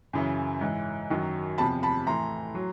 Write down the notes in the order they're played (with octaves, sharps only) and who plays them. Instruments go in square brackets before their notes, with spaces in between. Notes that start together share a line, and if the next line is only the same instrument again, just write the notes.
[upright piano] F#2 C#3 E3
G#2 E3
F#2 D#3 F#3
E2 C3 F3 A5 B5
A5 B5
A2 E3 A#5 C6
F#3